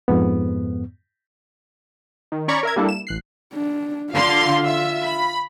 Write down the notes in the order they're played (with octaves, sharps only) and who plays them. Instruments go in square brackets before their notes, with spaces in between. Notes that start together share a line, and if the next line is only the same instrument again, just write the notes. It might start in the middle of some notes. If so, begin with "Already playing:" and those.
[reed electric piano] F2 G#2 B3
[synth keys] D#3
C#4 D5 A#5 B5 C#6 G#6
A#4 E5 G#6
G3 A#3 D4 E4 A4
E7
A1 F#6 C7
[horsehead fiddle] D4
[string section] D3 F5 C6 [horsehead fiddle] F4
[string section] E5
B5